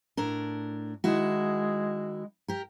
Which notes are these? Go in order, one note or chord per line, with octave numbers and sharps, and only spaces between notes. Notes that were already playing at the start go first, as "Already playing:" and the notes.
A2 D4 A#4
D#3 G#3 E4 F#4
G4 A#4